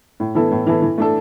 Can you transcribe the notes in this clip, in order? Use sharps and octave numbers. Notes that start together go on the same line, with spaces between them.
A2
E3 B3 E4 A4
A2
E3 B3 E4 A4
E3
A3 D4 A4